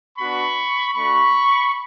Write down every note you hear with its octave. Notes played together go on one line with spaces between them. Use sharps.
B3 D4 F#4 B5 C#6
A3 D4 F#4 B5 C#6